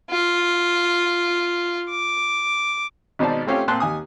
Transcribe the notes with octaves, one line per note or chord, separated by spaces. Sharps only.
F4
D6
G#1 B2 D#4 C5 D5 A5
A3 C4 C#4 F4 G4
A#2 C4 A5 C6 F#6
D#2 G#5 D#6